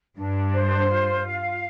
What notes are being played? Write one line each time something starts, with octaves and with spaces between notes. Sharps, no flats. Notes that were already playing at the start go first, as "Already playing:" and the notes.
G2 D4
C5
F4
F5